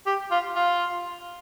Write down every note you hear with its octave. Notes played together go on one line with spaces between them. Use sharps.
G4
F4
F4